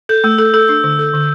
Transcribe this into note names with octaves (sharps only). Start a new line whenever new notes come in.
A4 G6
A3 E6
A4 E6
A4 E6
D4 E6
D3 E6
A4
D3